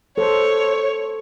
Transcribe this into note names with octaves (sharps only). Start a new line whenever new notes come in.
A4 C5 C#5